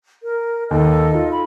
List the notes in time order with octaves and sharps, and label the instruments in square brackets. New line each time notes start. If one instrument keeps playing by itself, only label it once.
[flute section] A#4
[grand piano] D#2 [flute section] A4 D#5
[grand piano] D#4 F4
[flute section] B5